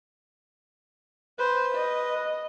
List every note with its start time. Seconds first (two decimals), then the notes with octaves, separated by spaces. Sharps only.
1.39 B4 C5
1.75 D#5